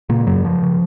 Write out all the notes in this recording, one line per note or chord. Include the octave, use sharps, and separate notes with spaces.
A#2 C#3 A#3
F#2 C#3 F#3
C#3 F3
C#3